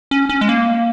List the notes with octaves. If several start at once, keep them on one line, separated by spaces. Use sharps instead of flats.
C#4
C#4
G#3
A#3